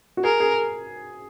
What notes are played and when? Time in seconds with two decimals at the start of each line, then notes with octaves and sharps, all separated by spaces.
0.17 F#4
0.23 G#4 A#4
0.40 G#4